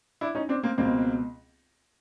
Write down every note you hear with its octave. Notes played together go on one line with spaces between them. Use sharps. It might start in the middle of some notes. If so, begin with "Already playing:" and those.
D4 E4
C#4 D#4
C4 D4
A#3 C4
C#2 B2 A#3 C4